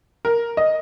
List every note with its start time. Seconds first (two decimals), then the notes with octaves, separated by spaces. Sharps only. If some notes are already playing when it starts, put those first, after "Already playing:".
0.25 A#4
0.57 D#5